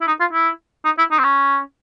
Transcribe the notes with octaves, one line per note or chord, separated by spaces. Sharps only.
E4
D#4
F4
E4
D#4
E4
D#4
C4
C#4